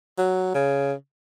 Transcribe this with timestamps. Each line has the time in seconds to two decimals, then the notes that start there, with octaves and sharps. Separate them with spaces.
0.18 F#3
0.54 C#3